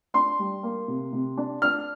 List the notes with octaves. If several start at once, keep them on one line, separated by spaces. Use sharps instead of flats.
D4 C6
G3
A#3
C3
C3
D4
D4 F6